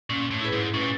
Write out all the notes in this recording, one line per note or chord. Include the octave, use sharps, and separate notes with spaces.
A#2 C#4
A2
E4 G#4 B4
G#2
A2 C#4
A#2